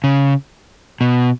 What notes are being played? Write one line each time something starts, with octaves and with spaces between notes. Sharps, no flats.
C#3
B2